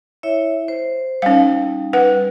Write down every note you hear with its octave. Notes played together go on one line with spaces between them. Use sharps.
E4 C#5 E5
C5
G3 C#4 D#4 F5
B4 F#5